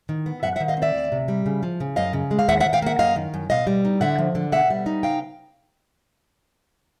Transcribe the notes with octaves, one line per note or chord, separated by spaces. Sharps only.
D#3
B3
F#2 E5 F#5
E5 F#5
D#3
D#5 F5
C4
D5 E5
D2
C3
G3
C#3
F3
C#3
F#2 D#5 F5
C#3
G#3
F5
D#2 E5 F#5
E5 F#5
D#3
F5 G5
A#3 E5 F#5
F#2 D#5 F5
D#3
F#2
B2 D#5 F5
G3
D#4
D3 E5 F#5
F3
D3
B2 E5 F#5
G3
D#4
C#3 F5 G5